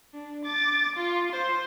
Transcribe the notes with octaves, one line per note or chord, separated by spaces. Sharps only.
D4
D6 A6
F4
C5